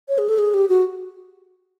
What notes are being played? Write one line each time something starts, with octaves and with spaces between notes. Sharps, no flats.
C#5
G#4
A4
G#4
G4
F#4